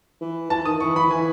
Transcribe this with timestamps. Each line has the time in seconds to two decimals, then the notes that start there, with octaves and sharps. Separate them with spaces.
0.21 E3
0.50 E3 A5
0.65 D#3 D#6
0.80 E3 C#6
0.96 E3 B5
1.11 E3 G#5